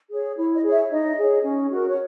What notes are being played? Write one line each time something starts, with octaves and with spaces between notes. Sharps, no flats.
G#4 C#5
E4 C#5
D#5
G#4 C#5
E5
D#4 D#5
G#4 C#5
C#4
F#4 A#4
C#5